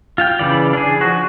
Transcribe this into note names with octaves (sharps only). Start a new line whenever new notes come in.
F4 F5 G5
C#3 E3 D5
D4 G#4
F3 F#4